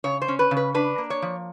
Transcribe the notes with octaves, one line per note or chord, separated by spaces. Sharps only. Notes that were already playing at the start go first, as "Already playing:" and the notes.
C#3 C#5
C5
C#4
B4
C#3
B4
D4 B4
A#3
C#5
F3